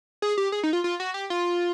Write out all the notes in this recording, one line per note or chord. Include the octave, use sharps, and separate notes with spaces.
G#4
G4
G#4
D#4
F4
F4
F#4
G4
F4